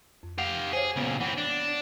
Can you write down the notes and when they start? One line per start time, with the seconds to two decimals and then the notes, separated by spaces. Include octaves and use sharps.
0.23 F2
0.38 G4 F5 F#5
0.73 G#4 C5 C#5
0.96 C#2 A#2 B3
1.21 E3 C4 F#5
1.38 D4